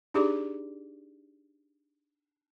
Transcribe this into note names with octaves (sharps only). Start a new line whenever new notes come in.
D4 D#4 G4 G#4 D5 D6